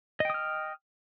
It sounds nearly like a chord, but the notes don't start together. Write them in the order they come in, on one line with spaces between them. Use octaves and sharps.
D#5 G5 D#6 F6